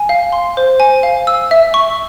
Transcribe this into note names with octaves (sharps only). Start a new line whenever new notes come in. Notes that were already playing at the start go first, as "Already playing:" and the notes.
Already playing: G#5
F5
C6
C5
G#5
F5
E6
E5
C#6